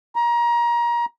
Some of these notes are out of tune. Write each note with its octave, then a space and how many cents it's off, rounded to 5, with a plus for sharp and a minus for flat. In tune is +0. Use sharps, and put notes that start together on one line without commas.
A#5 +25